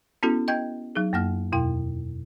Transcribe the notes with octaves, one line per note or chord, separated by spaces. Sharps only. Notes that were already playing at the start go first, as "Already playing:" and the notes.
B3 C#4 E4 F#4 A4
D#5 G5 G6 G#6
F#3 D#4 G#4
F#2 A#3 F#5 F6
E2 B2 E4 G5